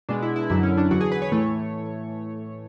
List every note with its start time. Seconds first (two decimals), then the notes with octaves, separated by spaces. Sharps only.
0.09 B2 G#3 D4
0.22 E4
0.36 E4
0.50 F#2 D3 F#3 E4
0.63 C#4
0.77 D4
0.91 E2 D3 F#3 F#4
1.01 G#4
1.12 B4
1.22 C#5
1.32 A2 E3 A3